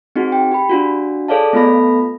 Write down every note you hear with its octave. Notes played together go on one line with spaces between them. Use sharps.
C4 D#4 F#4 G#4
G5
G4 B5
D4 F4 F#4
G#4 A4 C#5 D5 F5 A5
A3 B3 F4 A4 B5 A#6